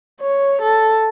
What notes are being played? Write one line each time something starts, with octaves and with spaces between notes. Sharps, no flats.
C#5
A4